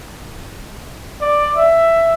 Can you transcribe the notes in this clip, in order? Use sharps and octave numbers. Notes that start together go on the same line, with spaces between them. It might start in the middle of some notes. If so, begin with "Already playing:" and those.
D5
E5